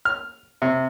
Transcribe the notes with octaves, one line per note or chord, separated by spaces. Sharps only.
F6
C3